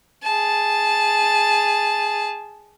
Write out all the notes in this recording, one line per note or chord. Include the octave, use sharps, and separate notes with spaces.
G#4 A5